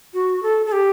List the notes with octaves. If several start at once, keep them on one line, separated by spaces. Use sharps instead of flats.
F#4
A4
A4
G4